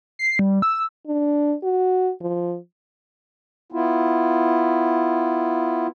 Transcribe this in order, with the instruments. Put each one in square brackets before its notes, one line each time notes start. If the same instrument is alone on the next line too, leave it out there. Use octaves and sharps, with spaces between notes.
[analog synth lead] C7
G3
E6
[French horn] D4
F#4
F3
[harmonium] B3 E4 F4